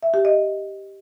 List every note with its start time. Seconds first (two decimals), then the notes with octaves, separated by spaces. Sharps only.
0.03 E5
0.14 G4
0.25 D#5